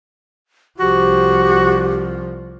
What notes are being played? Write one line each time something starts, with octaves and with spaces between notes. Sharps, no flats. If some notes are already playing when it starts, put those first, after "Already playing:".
C2 F3 F#4 G4